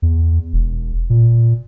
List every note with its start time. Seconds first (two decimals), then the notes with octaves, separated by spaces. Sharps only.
0.02 E2
0.53 E1
1.10 A#2